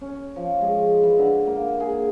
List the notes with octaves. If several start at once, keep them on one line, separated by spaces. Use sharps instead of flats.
C#4
F3
G#3
E3
D3
A#3
G#4